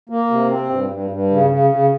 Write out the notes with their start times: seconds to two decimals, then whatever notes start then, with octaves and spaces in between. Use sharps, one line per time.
0.10 A#3
0.31 C3
0.50 C4
0.69 G2
0.90 G2
1.10 G2
1.31 C#3
1.50 C#3
1.70 C#3